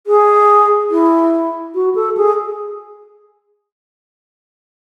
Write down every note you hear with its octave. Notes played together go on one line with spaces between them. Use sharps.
G#4
E4
F#4
A4
G#4